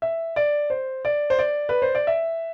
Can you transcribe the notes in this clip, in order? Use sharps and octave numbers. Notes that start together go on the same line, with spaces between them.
E5
D5
C5
D5
C5
D5
B4
C5
D5
E5